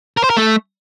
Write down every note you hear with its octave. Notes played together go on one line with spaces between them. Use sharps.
A#4
C5
A#4
A3